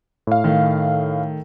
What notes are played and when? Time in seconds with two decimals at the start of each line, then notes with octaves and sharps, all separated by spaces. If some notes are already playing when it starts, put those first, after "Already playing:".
0.27 A2 F5
0.44 D#3 A3